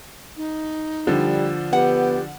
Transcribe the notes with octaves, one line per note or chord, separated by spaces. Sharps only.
D#4
D3 F3 G3
B3 G4 F#5